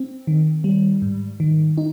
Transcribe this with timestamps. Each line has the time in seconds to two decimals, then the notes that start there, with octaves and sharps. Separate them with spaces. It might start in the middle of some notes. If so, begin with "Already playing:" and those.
Already playing: C4
0.27 D#3
0.64 G3
1.02 G#2
1.40 D#3
1.78 D#4